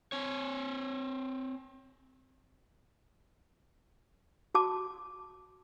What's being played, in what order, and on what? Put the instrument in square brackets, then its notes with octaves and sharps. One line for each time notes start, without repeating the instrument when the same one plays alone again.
[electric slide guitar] C4 C#5
[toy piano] F#4 A5 D6